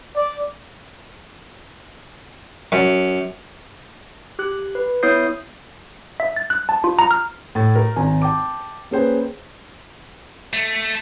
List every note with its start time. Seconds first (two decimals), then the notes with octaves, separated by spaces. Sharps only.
0.16 D5
2.72 F#2
4.39 G4 F#6
4.75 B4
5.03 B3 E4 C#5 D#6 G6 C7
6.20 E5
6.36 A6
6.50 F#6
6.69 A5
6.84 F4
6.99 A#5
7.11 F6
7.55 A2 A6
7.75 A#4
7.96 G#1 G#5 A#5
8.22 G5 A5 D6
8.91 A#3 C#4 G#4 B4 C5 G5
10.53 A3